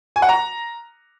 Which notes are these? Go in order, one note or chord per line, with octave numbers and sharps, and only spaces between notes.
G#5
F#5
A#5